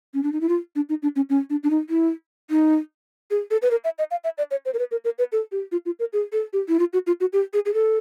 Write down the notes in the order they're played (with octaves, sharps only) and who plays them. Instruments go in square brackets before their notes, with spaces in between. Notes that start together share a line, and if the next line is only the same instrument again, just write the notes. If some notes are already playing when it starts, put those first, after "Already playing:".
[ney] C#4
D4
D#4
E4
F4
D4
D#4
D4
C#4
C#4
D4
D4
D#4
E4
D#4
G#4
A4
B4
A#4
E5
D#5
F5
E5
D5
C#5
C5
A#4
B4
A#4
A#4
B4
A4
G4
F4
F4
A#4
G#4
A4
G4
E4
F4
F#4
F4
F#4
G4
G#4
G#4
A4